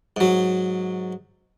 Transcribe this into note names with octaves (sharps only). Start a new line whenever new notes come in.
G#2 F#3